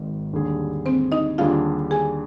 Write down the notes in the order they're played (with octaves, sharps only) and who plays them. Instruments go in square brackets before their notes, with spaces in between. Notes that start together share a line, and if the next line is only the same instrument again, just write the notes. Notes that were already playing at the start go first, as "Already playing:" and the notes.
Already playing: [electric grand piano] G#1 G#2 D#3
D#2 D3 G3 D4 G#4
[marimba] C4 C5
D#4 D#5
[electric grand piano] D#2 D3 G3 D4 G#4 [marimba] F4 F5
[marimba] G#4 G#5